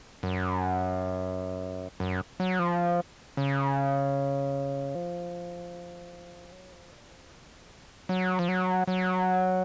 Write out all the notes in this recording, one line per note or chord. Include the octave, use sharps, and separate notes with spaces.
F#2
F#2
F#3
F3
C#3
F3
F#3
F3
A#2
F3
D#3
F3
F#3
F3
F#3
F#3